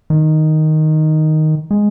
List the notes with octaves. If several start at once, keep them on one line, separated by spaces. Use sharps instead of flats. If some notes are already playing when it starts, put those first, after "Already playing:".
D#3
G#3